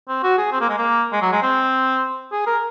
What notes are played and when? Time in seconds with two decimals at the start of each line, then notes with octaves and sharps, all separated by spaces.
0.08 C4
0.23 F#4
0.38 G#4
0.52 C4
0.61 A#3
0.69 G#3
0.78 A#3
1.13 G#3
1.22 F#3
1.32 G#3
1.42 C4
2.32 G#4
2.47 A#4